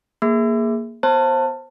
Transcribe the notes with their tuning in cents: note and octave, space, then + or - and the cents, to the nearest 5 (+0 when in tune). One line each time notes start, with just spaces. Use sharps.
A#3 +0 G#4 +0
B3 +0 C5 +20 A5 +20